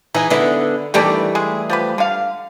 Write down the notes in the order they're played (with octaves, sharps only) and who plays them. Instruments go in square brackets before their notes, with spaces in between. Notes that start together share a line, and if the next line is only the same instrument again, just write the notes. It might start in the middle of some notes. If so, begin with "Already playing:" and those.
[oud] E3 [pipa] D#4 G#4
[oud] D3 B3 E4
[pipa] D#3 D4 D5 [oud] E3 G3 A3
[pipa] G#3 G#4
F3 G4 B4
D3 F5